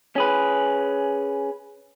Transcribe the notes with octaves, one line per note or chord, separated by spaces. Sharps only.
C#4 G#4 B4